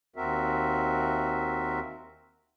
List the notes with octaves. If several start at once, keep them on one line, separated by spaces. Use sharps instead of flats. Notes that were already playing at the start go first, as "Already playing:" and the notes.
D#2 C4 F#4 A#4 E5